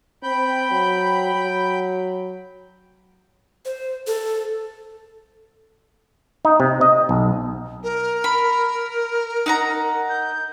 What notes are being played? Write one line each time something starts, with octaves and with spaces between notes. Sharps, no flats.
C4 G5 B5 G6
F#3
F#3
C5
A4
D#4
C3
D#5
B1
A#4
B5
D#4 F#5 A#5
G6